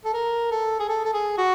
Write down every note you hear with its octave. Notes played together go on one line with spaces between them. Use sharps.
A4
A#4
A4
G#4
A4
A4
G#4
F#4